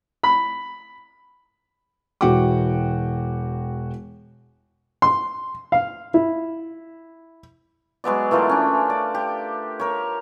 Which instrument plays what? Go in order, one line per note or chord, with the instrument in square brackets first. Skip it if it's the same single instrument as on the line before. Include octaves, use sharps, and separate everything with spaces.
[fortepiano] B5
[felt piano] E1 E3 F#4 F#5 G5 D6
[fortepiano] C6
F5
E4
[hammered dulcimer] F#3 G#3 B3 D5
E3 A3 F4 A#4
C#4 D4
D5
G4
A#4 C#5